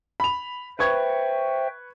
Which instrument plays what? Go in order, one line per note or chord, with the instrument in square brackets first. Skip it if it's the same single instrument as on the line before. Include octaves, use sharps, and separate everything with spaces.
[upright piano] B5 F7
[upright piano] B4 C#6 G#6 [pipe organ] C5 E5 G5